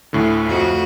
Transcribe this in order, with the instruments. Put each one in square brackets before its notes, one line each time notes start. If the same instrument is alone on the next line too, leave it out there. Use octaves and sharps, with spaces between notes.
[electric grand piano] D2 A2 D3
[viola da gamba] F2 A3 F#4